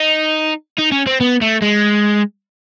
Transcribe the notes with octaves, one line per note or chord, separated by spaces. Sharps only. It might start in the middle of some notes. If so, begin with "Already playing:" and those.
Already playing: D#4
D#4
C#4
C4
B3
A3
G#3